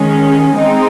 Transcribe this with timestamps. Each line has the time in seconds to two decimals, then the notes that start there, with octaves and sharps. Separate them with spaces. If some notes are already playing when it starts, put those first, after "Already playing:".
Already playing: D#3 G#3 C#4
0.55 G#3 C4 D#4